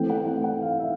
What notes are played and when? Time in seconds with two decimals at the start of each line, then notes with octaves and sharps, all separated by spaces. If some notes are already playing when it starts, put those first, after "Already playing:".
Already playing: E3 A3 C4 G5
0.10 F#5
0.27 F#5
0.44 F#5
0.62 F5
0.80 E5